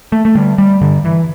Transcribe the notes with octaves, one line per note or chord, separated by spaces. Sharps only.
A3
A3
D3 G3
G3
G2 D3
E3